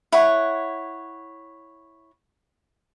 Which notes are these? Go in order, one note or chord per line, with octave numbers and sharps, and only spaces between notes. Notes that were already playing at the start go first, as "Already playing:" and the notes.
E4 C#5 F#5